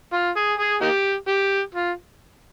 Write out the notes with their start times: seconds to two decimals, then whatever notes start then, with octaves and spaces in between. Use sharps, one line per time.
0.13 F4
0.36 G#4
0.59 G#4
0.81 A#3 D#4 G4
1.28 G4
1.74 F4